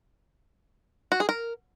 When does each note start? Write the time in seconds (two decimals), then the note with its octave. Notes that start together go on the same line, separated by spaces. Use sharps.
1.12 F#4
1.20 G#4
1.29 A#4